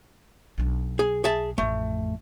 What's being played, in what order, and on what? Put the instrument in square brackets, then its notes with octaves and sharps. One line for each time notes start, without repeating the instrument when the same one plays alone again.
[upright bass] B1 D4
[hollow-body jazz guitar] G#4
G#4 E5 A5
[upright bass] A1 F2 [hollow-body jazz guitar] A3